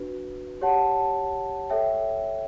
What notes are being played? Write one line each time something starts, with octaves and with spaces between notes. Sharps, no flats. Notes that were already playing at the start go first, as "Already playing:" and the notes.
Already playing: D4 F#4 B4
G4 C#5 F#5 A5
A4 C#5 E5 G5